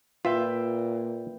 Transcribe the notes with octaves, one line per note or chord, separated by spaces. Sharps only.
A#2 F4 B4 E5 G5